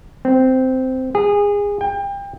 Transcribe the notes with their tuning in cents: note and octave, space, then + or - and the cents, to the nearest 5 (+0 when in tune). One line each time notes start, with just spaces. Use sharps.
C4 -10
G#4 -25
G5 +30